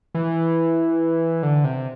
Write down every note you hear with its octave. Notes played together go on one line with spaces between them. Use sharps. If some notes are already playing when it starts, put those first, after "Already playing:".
E3
D3
C3